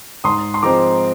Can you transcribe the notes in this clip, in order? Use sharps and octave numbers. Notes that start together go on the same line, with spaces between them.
G#2 C6 D#6
C6
F3 G#3 C4 A#5 D6